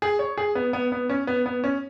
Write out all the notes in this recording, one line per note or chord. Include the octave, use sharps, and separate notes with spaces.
G#4
C#5
G#4
B3
B3
B3
C#4
B3
B3
C#4